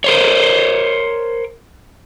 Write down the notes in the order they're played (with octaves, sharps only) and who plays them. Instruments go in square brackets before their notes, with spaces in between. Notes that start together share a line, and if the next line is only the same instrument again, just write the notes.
[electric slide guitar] A#4 C5 C#5